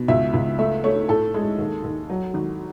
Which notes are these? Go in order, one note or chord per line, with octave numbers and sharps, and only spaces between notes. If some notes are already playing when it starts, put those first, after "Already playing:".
Already playing: B2
C#2 E5
C#2
A3 E5
A3 C#5
A2 A4
G#3
D#2
D#2
F#3
G#1